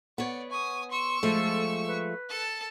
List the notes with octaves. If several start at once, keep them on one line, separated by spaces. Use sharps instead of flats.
B3 C#5 D5
G#5 C#6 D#6
C6 C#6 E6
F3 G#3 A3 A4
B4
A4 A5